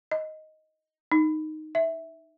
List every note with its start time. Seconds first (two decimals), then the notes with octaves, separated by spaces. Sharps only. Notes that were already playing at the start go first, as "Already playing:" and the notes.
0.11 D#5
1.12 D#4
1.75 E5